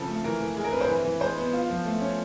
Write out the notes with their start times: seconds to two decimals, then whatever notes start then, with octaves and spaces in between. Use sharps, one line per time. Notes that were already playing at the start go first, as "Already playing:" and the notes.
Already playing: C#3 F3 C4 A4
0.08 A3
0.24 E3 A#4
0.41 E3
0.56 G#3 G#4
0.64 A#4
0.72 C4 B4
0.81 C5
0.88 E3 B4
1.05 E3
1.21 G#3 C5
1.37 B3
1.53 F4
1.70 F3
1.85 A3
2.01 C#4